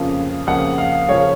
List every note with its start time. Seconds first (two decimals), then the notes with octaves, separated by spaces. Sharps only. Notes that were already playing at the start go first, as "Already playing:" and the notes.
Already playing: F2 C#3 F3 A#3 C#4
0.47 F2 C#3 F3 A#3 C#4 F#5
0.78 F5
1.08 C#3 F3 A#3 C#4 C#5